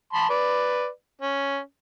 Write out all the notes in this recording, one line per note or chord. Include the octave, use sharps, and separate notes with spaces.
A5 B5 C6
B4 D5
C#4